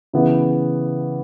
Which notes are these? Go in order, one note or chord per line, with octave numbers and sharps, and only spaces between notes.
C#3 E3 B3